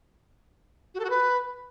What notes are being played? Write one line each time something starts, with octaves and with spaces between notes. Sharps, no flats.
F#4
A4
F#4
B4